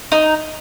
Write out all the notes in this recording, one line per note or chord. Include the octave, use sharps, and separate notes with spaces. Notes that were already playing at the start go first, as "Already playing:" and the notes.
D#4